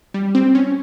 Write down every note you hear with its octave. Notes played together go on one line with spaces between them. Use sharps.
G3
C4
C#4